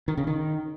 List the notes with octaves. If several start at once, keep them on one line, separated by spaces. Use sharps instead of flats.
D#3
C#3
D#3